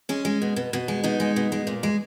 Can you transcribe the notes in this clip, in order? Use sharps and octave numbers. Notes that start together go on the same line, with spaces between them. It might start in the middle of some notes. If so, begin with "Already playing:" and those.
G#3 C#4
G#3
B2
B2
B2
G#3
B2 D#4
G#3
B2
G#3
A#2
G#3